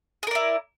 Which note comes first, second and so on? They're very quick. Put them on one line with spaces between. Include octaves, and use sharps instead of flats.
G#4 A#4 D5 E4